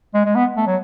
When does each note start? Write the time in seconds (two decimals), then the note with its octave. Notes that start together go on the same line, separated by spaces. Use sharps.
0.14 G#3
0.25 G#3
0.35 B3
0.56 A3
0.67 F#3